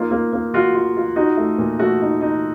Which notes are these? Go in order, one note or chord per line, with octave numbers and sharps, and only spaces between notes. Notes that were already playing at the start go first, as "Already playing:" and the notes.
Already playing: A#3 D#4 F4
A#3
A#3
F4 F#4
F4
F4
D#4 F#4
A3
A#2
A3 F#4
D#4
D#4